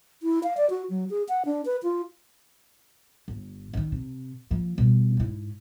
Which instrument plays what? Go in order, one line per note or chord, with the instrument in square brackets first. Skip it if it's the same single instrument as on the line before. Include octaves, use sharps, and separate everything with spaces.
[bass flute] E4
F5
D5
F#4
F#3
G#4
F#5
D4
B4
F4
[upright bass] G1
D3 D#3
C3
F3 A#3
B2 G3
G#2 E4